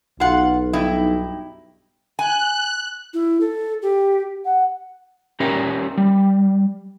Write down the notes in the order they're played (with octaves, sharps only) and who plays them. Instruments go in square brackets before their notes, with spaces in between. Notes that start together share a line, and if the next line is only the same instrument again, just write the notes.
[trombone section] B1 [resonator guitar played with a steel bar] F4 F#5
[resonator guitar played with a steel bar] G2 D#4 E4
[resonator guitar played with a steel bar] G#5 [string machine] F#6
[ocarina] E4
A4
G4
F#5
[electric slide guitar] C#4 G4 A#4 C#5 E5
G3